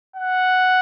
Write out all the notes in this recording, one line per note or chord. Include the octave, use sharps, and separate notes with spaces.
F#5